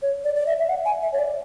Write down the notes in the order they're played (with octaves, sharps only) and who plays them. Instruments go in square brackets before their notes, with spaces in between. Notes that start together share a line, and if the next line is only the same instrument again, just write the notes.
[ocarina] C#5
D5
D5
E5
E5
F#5
G#5
E5
C#5
D5